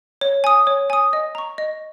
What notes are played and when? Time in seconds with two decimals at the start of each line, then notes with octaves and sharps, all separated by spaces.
0.21 C#5
0.44 G#5 D#6
0.67 C#5
0.90 G#5 D#6
1.13 D#5
1.35 A#5 C#6
1.58 D#5